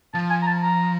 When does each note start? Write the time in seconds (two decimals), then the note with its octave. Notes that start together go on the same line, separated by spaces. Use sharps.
0.14 F3 A5
0.30 G#5
0.43 A#5
0.47 A5
0.63 A#5